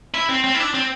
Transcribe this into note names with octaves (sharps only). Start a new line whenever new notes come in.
E4
C4
C4
E4
D4
C4